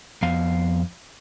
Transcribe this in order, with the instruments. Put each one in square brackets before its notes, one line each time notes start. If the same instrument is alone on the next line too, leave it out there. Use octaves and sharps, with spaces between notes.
[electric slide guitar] F2 B3 F5